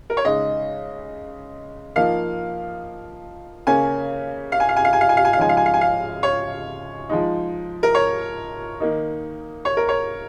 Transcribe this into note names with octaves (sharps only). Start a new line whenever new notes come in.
A#4
C#5
C#3 G#3 D#4 D#5
F3 A#3 D#4 F5
C#3 A#3 C#4 G#5
F5
G#5
F5
G#5
F5
G#5
F5
G#5
F5
G#5
F5
C#3 F3 G#3 D#4 G#5
F5
G#5
F5
G#5
F5
C#5
F3 G#3 D#4
A#4
C#5
D#3 A#3 D#4
C#5
A#4
C#5